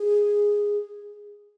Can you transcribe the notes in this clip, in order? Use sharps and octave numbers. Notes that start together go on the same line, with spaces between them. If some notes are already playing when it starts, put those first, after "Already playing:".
Already playing: G#4